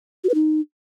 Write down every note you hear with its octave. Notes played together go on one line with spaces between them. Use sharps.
F#4
B4
D#4